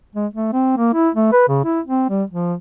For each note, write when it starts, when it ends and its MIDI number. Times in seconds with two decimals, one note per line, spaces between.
0.16 0.27 56
0.34 0.53 57
0.53 0.75 60
0.77 0.91 58
0.94 1.09 64
1.15 1.29 57
1.32 1.46 71
1.48 1.60 49
1.65 1.81 64
1.86 2.08 60
2.10 2.23 55
2.30 2.54 53